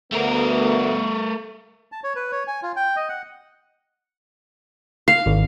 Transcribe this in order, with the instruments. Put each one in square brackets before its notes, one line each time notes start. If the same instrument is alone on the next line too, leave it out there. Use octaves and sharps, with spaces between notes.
[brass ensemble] D2 B3 [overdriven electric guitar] A3 A#4
[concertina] A5
C#5
B4
C#5
G#5
F4
G5
D#5
F#5
[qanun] F5
[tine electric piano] G#1